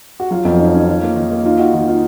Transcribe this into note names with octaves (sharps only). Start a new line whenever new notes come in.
F#4
F#3 F4
F2 F4
C#4 D#4
C#4 D#4
D#3 F4
A#3
D#3 D#4
A#3
D#4 F4
D#4 F#4
D#3 F4
D#4 F4